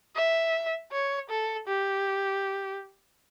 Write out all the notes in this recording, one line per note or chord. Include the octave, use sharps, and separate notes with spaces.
E5
C#5
A4
G4